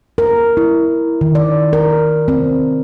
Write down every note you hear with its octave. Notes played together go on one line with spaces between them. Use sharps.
A#4
E4
D#3
D5
A#4
C4